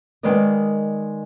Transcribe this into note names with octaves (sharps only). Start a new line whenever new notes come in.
D#3 G#3 A#4 B4 D5 D#5